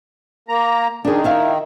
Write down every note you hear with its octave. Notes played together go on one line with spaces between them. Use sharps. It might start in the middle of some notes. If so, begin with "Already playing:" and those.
A#3 A#5
D#3 D4 G#4
E4 E5 F5